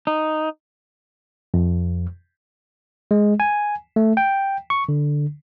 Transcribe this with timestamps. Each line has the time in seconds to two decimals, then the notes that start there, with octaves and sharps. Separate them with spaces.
0.07 D#4
1.54 F2
3.11 G#3
3.40 G#5
3.96 A3
4.17 G5
4.70 C#6
4.89 D3